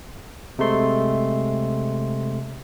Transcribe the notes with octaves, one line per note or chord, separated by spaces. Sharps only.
C3 G#3 A3 C6